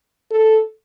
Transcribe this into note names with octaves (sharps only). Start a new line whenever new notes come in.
A4